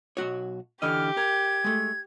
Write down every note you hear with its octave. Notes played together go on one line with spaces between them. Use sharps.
B1 F#4 C#5
D3 E3 G4 D#5 F6
A#4 G#6
G#3 A3